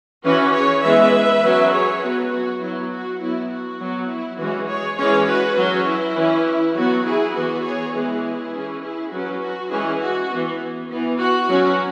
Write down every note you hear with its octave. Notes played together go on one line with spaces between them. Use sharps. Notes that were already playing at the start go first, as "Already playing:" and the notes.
E3 C#4 F#4 B4
G#4 C#5
E3 G#3 B3 B4 E5
F#3 C#4
G#4 C#5
F#3 B3 F#4 B4
F#4
F#3 B3 E4
F#4
F#3 B3 E4
F#4
F#3 B3
E4
E3 G#3 C#4 F#4
G#4 C#5
E3 G#3 C#4 G#4 C#5
F#4 B4
F#3 C#4 F#4
E4
E3 C#4
F#3 B3 F#4
E4 G#4
E3 B3 F#4 B4
G#4 C#5
E3 G#3 B3 E4 G#4
E3 C#4
E4 G#4
F#3 C#4 F#4 B4
F#4
E3 G#3 C#4 E4 G#4
F#4
E3 B3
E3 B3
F#4
F#3 C#4